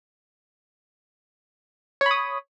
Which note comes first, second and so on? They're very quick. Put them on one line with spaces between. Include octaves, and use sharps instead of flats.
C#5 B5 D#6